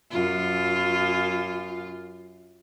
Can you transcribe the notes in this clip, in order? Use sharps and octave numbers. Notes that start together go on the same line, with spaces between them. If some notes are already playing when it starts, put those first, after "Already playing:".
F#2 F4